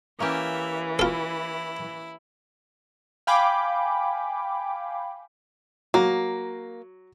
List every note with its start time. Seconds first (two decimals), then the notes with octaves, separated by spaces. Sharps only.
0.20 E3 A#3 C#4 G4 E5
0.99 E4 F4 A4
3.27 F5 G5 G#5 B5 D6
5.94 F#3 A#3